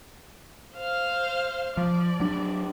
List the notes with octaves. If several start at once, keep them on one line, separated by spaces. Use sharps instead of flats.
C5 F5
F3 D5
F#3 D4